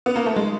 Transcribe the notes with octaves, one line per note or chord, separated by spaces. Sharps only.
B3
A#3
A3
G#3